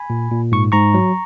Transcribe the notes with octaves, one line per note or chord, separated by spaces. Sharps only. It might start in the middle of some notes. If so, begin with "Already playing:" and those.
Already playing: G#5 B5
A#2
A#2
G#2 C#6
G#2 A#5 C#6
F#3